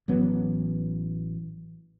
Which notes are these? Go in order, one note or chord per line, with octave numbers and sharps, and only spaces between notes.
A1 E3 F#3 B3